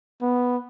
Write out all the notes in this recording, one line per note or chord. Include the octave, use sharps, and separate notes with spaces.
B3